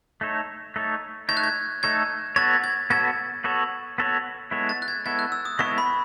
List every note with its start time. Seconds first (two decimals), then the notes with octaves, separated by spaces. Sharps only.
0.21 A3 D#4 A4 C#5
0.76 A3 D#4 A4 C#5
1.29 A3 D#4 A4 C#5 G#6
1.37 F#6
1.44 G#6
1.83 A3 D#4 A4 C#5 G#6
2.36 B3 F#4 A4 C#5 A6
2.64 G#6
2.90 B3 F#4 A4 C#5 G#6
3.44 B3 F#4 A4 C#5
3.98 B3 F#4 A4 C#5
4.51 G#3 B3 E4 A4 C#5
4.69 A6
4.82 F#6
4.88 G#6
5.06 G#3 B3 E4 A4 C#5 G#6
5.19 F#6
5.32 E6
5.45 D#6
5.59 G#3 B3 E4 A4 C#5 C#6
5.78 B5